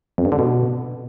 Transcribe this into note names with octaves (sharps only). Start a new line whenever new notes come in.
F2
G2
D3
B2